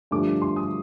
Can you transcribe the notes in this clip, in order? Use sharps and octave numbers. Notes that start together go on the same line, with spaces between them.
G2 D3 F3 A3 D6
C6
D#6